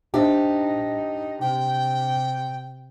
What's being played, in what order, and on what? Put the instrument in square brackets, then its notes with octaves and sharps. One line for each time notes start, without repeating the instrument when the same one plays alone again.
[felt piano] D4 C5 E5 [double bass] D#4 [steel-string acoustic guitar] G4
[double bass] C3 [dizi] G5